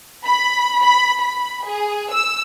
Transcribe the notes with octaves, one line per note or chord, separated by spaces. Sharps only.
B5
B5
B5
G#4
E6